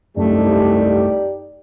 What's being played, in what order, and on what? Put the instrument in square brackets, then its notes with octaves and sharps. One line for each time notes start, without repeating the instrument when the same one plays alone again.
[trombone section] C2 A4 [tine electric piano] F#2 [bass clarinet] A3 [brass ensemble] D#4 G4 D5